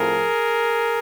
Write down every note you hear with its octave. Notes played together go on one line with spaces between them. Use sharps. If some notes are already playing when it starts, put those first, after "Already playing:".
Already playing: A2 F3 A3 C4 G#4 A#4